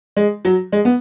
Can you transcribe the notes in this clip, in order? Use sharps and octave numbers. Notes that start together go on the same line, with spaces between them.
G#3
F#3
G#3
B3